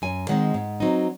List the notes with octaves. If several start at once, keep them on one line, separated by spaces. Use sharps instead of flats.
F#2 G#5
D#3 G#3 C4 F#5
G#2
F#3 C4 D#4